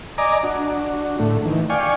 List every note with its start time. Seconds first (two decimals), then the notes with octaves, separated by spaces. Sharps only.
0.18 D5 D#5 G#5 A#5 D6
0.43 D4 F#4
1.19 A2 D3 A3
1.45 D#3 E3
1.70 D5 F5 G5 G#5 C#6